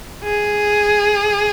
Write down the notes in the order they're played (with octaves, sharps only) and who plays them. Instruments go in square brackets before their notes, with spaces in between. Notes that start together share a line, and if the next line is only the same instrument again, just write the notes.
[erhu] G#4